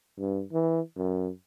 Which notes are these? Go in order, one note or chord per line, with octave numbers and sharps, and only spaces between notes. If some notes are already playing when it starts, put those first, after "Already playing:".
G2
E3
F#2